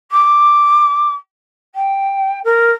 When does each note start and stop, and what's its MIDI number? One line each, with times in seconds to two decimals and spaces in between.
0.11 1.13 86
1.75 2.39 79
2.44 2.71 70